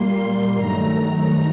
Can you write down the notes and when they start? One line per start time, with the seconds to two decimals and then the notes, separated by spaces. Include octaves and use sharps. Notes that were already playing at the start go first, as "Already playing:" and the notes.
Already playing: A#2 G3 A#3 C6
0.54 G2 D#3 F#3 A3 A#5